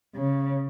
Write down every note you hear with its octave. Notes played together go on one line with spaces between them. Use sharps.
C#3